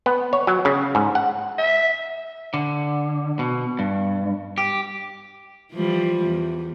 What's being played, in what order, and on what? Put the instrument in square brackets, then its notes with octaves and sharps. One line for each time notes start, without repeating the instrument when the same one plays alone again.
[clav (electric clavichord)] B3
C#5
F#3
C#3
G#2
F#5
[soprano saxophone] E5
[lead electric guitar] D3
B2
G2
G4
[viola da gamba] E3 F3 G3
E2